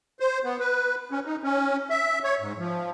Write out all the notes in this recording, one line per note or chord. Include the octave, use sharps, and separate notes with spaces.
C5
B3
B4
C#4
D#4
C#4
E5
C#5
G#2
F3